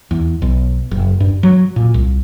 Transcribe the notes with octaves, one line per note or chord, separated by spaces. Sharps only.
E2
B1
F#1
G2
F#3
A#2
C2